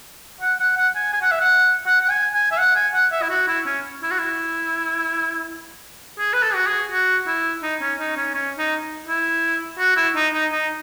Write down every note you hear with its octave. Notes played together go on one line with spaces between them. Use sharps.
F#5
F#5
F#5
G#5
G#5
F#5
E5
F#5
F#5
F#5
G#5
G#5
E5
F#5
G#5
F#5
E5
E4
F#4
E4
C#4
E4
F#4
E4
G#4
B4
A4
F#4
G#4
F#4
E4
D#4
C#4
D#4
C#4
C#4
D#4
E4
F#4
E4
D#4
D#4
D#4